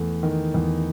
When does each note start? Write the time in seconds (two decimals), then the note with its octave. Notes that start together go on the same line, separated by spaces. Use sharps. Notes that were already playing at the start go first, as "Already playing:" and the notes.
Already playing: E2 A3
0.23 D#3
0.54 E2